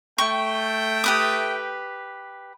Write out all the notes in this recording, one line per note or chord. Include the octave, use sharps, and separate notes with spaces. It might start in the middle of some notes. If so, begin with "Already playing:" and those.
A3 G5 C#6
G4 B4 D#6